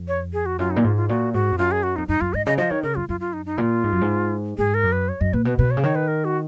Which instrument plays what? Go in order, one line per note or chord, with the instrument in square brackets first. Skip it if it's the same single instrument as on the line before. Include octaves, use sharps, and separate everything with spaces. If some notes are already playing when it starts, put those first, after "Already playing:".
Already playing: [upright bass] F2
[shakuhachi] C#5
G#4
F#4
[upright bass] F#2 [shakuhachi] F4
[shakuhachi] D#4
[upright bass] A#2
[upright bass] G#2 [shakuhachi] F4
[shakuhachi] F4
[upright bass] A#2 [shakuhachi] F#4
[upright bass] G#2 [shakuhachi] F#4
[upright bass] F2
[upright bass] F#2 [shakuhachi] F4
[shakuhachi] G#4
F#4
[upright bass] F2 [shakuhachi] D#4
[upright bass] F#2 [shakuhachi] D#4
[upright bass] F#2 [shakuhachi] F4
[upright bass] G#2 [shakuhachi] D#5
[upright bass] C#3 [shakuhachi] D#5
[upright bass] F3 [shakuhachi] D#5
[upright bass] D#3 [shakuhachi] C#5
[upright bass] C#3 [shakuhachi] A#4
[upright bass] F#2 [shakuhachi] F4
[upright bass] F#2 [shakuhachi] F4
[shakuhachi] F4
D#4
D#4
[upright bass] A#2 [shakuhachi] F4
[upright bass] G#2
F#2
G#2
[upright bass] G#2 [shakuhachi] G#4
[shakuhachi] A#4
[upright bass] F#2
[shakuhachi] B4
C#5
[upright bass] F#2 [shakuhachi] D#5
[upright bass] A#2 [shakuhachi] B4
[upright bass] B2 [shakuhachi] B4
[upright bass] B2 [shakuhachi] B4
[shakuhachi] C#5
[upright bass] C#3
[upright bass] D#3 [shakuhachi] C#5
[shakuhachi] B4
A#4
F#4